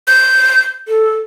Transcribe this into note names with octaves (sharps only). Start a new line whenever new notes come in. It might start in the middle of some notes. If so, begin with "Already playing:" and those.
G6
A4